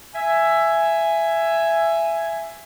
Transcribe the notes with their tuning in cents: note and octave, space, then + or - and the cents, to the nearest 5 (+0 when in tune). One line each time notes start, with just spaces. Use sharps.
E5 +15 G#5 +0